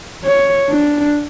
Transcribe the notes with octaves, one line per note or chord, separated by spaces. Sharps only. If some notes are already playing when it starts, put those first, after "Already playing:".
C#5
D4